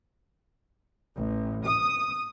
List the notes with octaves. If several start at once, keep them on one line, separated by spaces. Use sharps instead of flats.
A1
D#6